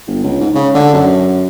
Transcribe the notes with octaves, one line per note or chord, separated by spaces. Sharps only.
G1
C#2
G#2
C#3
D3
F#2